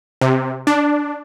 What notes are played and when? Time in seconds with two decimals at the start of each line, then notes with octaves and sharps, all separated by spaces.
0.21 C3
0.67 D4